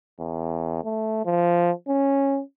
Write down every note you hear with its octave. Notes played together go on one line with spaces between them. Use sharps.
E2
A3
F3
C#4